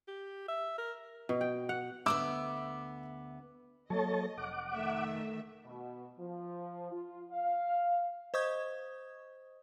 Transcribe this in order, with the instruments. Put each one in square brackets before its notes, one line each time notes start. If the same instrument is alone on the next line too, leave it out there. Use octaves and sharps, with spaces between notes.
[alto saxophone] G4
E5
A#4
[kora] B2
G5
F#5
[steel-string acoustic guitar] D2 B3 E5 [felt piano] D6 E6
[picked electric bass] F#3 A3 A#3 [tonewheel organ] A4 C#5 A5 [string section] D#5
[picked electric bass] F1 [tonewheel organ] F#5 D6
[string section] D#3 A3 E5
[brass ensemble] B2
F3
F4
F5
[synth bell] C5 D#5 C#6 D#6 G6 G#6